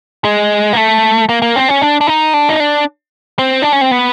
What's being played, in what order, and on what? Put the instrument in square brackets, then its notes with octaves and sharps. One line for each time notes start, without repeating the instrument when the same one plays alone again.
[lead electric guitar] G#3
A#3
A3
A#3
A#3
C4
C#4
D4
D4
D#4
D4
D#4
D4
C4
D4
C#4
C4
B3